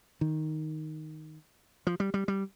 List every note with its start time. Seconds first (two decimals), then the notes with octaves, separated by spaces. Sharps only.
0.21 D#3
1.87 F3
2.00 G3
2.14 G3
2.28 G3